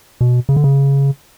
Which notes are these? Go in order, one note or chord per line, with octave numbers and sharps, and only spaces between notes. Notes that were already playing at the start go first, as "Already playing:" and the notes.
B2
C#3
D3
C#3